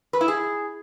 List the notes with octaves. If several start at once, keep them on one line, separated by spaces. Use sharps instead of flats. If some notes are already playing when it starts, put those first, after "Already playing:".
B4
E4
G#4